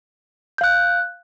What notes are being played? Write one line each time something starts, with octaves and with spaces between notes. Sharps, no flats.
F5 F#6 G6